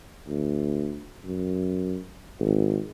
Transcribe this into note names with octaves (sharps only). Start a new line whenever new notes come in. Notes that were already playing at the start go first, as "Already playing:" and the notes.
D2
F#2
G#1